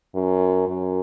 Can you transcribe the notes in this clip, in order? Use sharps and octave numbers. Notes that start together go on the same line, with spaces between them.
F#2
F#2